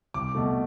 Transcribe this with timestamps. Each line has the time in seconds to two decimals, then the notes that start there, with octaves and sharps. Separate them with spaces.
0.14 C2 D6
0.35 B2 A3